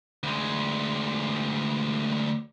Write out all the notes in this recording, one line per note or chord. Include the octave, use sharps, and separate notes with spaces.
D2 G#3